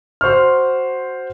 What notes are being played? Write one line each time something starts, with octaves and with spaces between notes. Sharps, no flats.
F#4 C5 C#6 F6